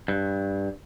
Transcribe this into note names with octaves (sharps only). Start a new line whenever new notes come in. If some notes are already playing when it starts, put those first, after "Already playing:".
G2